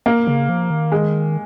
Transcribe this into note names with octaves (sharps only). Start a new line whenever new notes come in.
A#3
C#3
F3
D#3
G#3